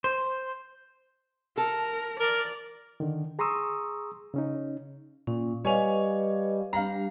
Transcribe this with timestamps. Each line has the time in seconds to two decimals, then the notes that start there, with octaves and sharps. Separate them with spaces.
0.04 C5
1.58 A4 A#4
2.20 A#4 D5
3.00 D3 D#3
3.39 G#4 A#5 C6 C#6 D#6 E6
4.34 C#3 C#4 D#4
5.27 A#2 C#4
5.65 G3 B4 C#5 D#5 F5 G#5 F7
6.73 G3 D4 G4 F5 A#5